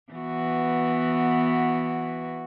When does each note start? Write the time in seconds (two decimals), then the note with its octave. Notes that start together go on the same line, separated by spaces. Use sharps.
0.12 E3 B3 F#4